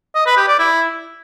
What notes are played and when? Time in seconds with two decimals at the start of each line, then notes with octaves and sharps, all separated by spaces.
0.15 D#5
0.26 B4
0.37 G4
0.48 D5
0.59 E4